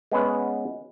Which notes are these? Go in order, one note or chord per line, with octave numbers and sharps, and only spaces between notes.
G#3 B3 C#4 B4 F#5